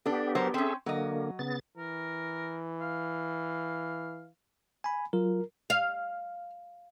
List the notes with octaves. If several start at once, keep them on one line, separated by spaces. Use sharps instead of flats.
B3 D4 G4 A4
F#3 A#4 C5
C4 C#4 G#4 A4 E5
D3 F#3 A#3 D#5
C#3 B3 A6
E3 A#4
F5
G#5 B5
F#3 F4 A#4
F5